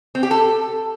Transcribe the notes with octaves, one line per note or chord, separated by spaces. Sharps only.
C4
G4
A4